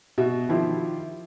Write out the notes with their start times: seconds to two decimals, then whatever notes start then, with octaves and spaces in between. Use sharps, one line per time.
0.18 B2 F#4 E5
0.49 D#3 F3 E4 F4 G4